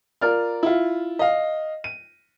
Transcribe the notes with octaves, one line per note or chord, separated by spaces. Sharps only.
F4 A#4 D5 F6
E4 F4
D#5 F5
D#7